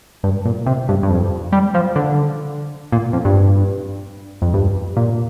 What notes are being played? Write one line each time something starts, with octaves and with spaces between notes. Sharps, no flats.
G2
A#2
C3
G2
G2
F2
G3
F3
D3
A#2
F2
G2
F2
G2
A#2